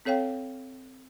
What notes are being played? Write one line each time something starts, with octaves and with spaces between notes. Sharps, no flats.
C4 A4 C#5 F5 G5